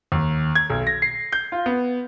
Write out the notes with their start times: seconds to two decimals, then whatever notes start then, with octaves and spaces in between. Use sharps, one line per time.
0.12 D#2
0.55 G#6
0.70 B1
0.87 A#6
1.02 C7
1.32 G6
1.52 F4
1.66 B3